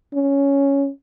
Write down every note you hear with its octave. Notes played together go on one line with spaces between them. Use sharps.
C#4